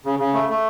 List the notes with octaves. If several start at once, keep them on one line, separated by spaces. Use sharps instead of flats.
C#3
C#3
A3
A3